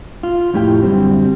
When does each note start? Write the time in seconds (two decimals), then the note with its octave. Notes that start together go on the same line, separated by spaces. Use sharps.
0.23 F4
0.54 F2 A2 E4 G4 G5
0.83 F#2 D3 G3 C4